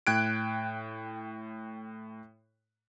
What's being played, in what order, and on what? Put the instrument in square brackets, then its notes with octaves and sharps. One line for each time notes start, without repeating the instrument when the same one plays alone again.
[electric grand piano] A2 G5 F#6 G#6 D7